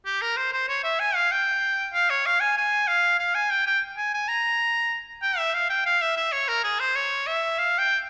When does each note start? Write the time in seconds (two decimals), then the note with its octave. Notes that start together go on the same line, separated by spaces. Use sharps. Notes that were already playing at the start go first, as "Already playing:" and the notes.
0.06 G4
0.22 A#4
0.37 C5
0.53 C5
0.69 C#5
0.84 E5
1.00 G#5
1.15 F5
1.32 G5
1.94 F5
2.10 C#5
2.26 F5
2.41 G#5
2.57 G#5
2.88 F5
3.20 F5
3.35 G#5
3.51 G5
3.66 G5
3.97 G#5
4.14 G#5
4.29 A#5
5.23 G5
5.38 E5
5.54 F5
5.69 G5
5.86 F5
6.01 E5
6.16 E5
6.33 C#5
6.48 A#4
6.64 G#4
6.80 C5
6.96 C#5
7.27 E5
7.58 F5
7.79 G5